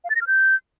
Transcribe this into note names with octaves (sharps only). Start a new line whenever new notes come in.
F5
A6
A#6
F6
G6